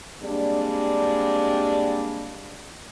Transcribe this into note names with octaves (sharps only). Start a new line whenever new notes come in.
G3 G#3 A#3 C4 D4